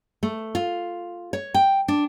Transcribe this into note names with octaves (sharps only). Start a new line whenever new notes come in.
A3
F4
C#5
G5
D4